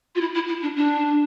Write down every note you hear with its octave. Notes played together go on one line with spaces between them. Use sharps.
F4
E4
E4
E4
D4
D4